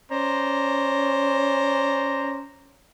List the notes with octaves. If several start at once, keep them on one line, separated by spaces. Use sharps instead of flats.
C#4 C5 D5 A#5